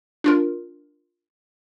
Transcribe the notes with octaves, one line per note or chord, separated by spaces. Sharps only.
D4 F4 A#4